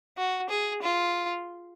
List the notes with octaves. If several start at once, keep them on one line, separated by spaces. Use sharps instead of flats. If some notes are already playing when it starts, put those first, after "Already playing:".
F#4
G#4
F4